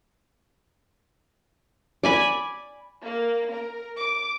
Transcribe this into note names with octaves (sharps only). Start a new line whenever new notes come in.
D5 G#5 B5
A#3
A#4
D6